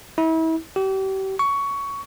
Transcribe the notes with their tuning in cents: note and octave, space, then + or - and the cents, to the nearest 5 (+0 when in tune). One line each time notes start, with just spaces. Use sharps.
E4 -35
G4 -35
C#6 +15